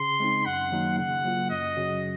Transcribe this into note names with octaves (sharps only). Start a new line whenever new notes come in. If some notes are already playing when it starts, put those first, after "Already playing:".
Already playing: C#3 C6
G#3 C4 D#4
F#2 F#5
D#3 F#3 A#3 D#4
C#3 F#5
F#3 A#3 F4
F#2 D#5
C#3 F#3 C#4 F#4